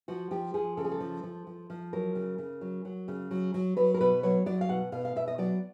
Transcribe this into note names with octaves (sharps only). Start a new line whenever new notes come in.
F3 F#4
F3 G4
F3 G#4
C#3 A4
G#4
A4
F3
F3
F3
F3
F#3 A#4
C#3
C#3
F#3
F#3
C#3
F#3
F#3
F#3 B4
A#4
B2 B4
F#3 C#5
F#3 D5
F5
B2 F#5
B2 F5
F5
B2 E5
D#5
F#3 D5